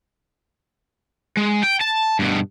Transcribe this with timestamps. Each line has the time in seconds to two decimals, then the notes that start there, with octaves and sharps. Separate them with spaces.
1.37 G#3
1.63 G5
1.81 A5
2.19 G2 B2